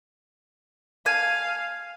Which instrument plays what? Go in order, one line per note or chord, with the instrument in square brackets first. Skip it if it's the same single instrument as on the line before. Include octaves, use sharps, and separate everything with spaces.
[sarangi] F5 [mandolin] G#5